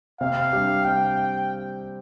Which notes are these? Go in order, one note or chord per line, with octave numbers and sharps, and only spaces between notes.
C3 F5
G3 D4 G4
C3 G5